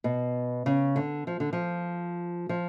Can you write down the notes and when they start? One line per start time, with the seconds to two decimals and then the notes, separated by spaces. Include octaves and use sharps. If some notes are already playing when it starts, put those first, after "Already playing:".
0.04 B2
0.66 C#3
0.96 D3
1.27 F3
1.40 D3
1.53 F3
2.49 F3